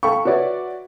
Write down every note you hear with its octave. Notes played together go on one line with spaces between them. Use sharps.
A4 F5 G5 B5 C#6
F#4 B4 C#5 D5 E5